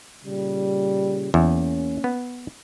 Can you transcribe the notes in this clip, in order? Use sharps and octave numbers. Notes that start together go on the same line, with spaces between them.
A#2 C#3 G3
E2 A#3 C#4
B3